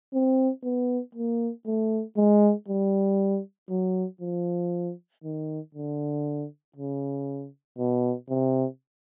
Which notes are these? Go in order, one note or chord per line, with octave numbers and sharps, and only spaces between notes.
C4
B3
A#3
A3
G#3
G3
F#3
F3
D#3
D3
C#3
B2
C3